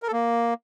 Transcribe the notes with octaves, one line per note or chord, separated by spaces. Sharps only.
A#4
A4
A#3